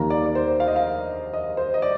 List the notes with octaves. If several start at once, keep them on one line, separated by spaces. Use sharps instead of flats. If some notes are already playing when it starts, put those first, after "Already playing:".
Already playing: D#2 D#3 A#3 A#5
D5
D5
C5
F5
D#5
F5
D#5
C5
D#5
D5